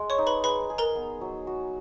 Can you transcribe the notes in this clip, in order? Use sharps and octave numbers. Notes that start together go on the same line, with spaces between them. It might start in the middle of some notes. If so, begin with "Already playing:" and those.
Already playing: G#3
C#5 C#6
D#4
B4 B5
G#4 B4 B5
G#4
A#4 A#5
B3
F#3
F#4